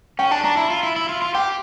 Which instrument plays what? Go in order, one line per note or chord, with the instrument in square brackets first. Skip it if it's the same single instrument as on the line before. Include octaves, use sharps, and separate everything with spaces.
[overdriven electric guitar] C#4 [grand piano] G5
[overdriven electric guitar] D4 [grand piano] A5
[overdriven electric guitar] D4 [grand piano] A#5
[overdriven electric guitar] E4
F4
E4
E4
F4
F4
[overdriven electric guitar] G4 [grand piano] G5